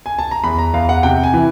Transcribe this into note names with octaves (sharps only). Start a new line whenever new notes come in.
G#5
A5
A#5
E2 B5
A#5
E2 F5
F#5
C3 G5
G#5
E3